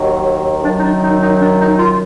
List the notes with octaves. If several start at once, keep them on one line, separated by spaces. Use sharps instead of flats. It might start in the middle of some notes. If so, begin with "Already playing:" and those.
Already playing: D#2 D#3 F#3
F#2 D#3 F#3 D4
D#4
D4
D#4
D#4
D4
D#4
F4